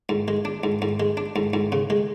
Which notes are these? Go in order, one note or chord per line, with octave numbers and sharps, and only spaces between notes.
G#2
G#3
D4
G#2
G#2
G#3
D4
G#2
G#2
C#3
G#3